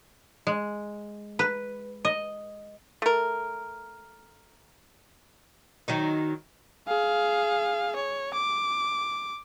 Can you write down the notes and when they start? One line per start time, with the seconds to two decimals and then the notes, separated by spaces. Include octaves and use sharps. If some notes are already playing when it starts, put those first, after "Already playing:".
0.47 G#3
1.39 B4
2.05 D#5
3.02 A3 A#4
5.88 D#3 F#3 D#4
6.88 G#4 F5
7.96 C#5
8.34 D6